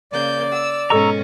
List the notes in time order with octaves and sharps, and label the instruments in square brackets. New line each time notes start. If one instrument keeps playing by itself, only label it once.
[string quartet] C#3 A#3 G6 [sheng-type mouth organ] D5
[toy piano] F#5 [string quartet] E6
[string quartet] G#2 B2 C#4 [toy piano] A4 D#5 [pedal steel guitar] A#5 C#6 E6